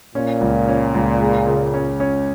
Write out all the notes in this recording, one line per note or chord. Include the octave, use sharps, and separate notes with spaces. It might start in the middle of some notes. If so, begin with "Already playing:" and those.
A#2 C#4
C#2
C#4
C#2
G#3
C#3
C#4
C#4